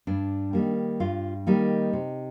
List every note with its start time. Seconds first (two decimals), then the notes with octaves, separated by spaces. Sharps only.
0.07 G2 D4
0.53 D#3 G3 A#3
1.00 G2 F4
1.47 D#3 G3 A#3 D#4
1.93 C3